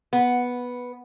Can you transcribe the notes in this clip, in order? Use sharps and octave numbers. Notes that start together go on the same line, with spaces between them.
B3